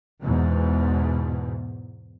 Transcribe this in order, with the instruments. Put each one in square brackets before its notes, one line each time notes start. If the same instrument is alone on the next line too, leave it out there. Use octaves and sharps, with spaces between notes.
[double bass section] E2 G#2 B2